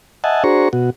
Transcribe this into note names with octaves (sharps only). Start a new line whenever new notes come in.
D#5 E5 F#5 G#5 A5
D4 F#4 G#4 C5 A#5 C#6
B2 F#4